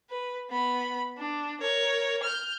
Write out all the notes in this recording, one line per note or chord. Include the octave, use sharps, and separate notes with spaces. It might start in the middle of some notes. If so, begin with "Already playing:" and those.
B4
B3 B5
D4
A#4 C#5
F6 G6